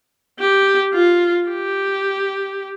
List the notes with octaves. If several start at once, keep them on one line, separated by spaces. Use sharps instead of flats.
G4
F4
G4